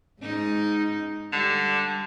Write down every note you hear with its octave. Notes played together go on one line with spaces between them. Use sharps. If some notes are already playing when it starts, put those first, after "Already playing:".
G#2 D#4
D3 G3